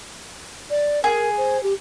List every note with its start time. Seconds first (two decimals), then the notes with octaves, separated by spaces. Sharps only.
0.70 D5
1.04 G#4 A#4
1.38 C5
1.63 G4